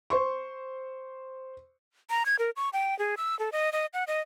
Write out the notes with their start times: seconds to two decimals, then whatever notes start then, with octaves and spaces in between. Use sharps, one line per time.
0.10 C5 C6 C#6
2.10 A#5
2.26 G#6
2.39 A#4
2.56 C#6
2.73 G5
2.99 G#4
3.17 E6
3.39 A4
3.52 D#5
3.72 D#5
3.94 F#5
4.07 D#5